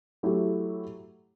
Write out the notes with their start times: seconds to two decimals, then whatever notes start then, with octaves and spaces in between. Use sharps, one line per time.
0.23 F#3 A3 E4 G4